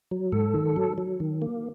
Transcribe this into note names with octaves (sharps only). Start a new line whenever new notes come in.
F#3
G#2 A4
D#3
F#3
F#3
D#3
A#3